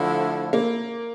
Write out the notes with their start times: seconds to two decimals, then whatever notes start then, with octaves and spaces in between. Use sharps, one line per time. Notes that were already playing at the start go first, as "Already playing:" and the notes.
Already playing: D3 F3 A3 E4
0.53 A#3